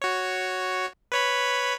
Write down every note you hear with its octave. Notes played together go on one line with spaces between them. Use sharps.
F#4 C#5
B4 C#5 B5